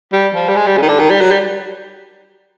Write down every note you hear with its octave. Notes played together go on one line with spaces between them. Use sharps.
G3
F3
G3
G#3
G3
C#3
D#3
D3
D#3
G3
F#3
G3